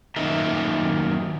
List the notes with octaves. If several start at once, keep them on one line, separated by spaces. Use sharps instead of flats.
F#2 D#3 A#3 D#4 A#4 E5